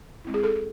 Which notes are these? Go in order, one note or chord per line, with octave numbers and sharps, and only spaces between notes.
G#3 C4 E4
G#4
A4